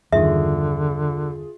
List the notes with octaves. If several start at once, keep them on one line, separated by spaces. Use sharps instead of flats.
E2 G2 D3 D#3 F4 G#4 E5